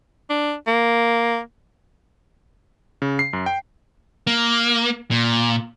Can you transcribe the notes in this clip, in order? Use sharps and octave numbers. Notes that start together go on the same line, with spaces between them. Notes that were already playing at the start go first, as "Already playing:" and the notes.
D4
A#3
C#3
C7
F#2
G5
A#3
A#2